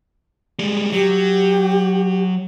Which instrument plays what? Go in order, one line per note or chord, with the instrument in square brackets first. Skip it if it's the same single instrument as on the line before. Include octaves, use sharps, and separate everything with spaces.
[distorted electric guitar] G3 G#3
[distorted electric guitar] F#3 [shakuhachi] G4